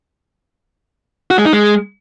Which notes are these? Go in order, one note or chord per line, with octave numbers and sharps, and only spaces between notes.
F#4
G#3
D#4
G#3